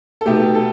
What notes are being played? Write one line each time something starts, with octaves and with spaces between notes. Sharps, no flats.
A4
B2 A3 D#4 G4
A4